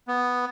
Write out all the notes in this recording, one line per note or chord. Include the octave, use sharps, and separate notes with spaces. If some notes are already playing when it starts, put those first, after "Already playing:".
B3